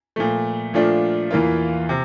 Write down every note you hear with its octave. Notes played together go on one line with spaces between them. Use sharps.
A#2 F3 A3
A#2 F3 A3 D4 F4
E2 E3 A#3 F4
C3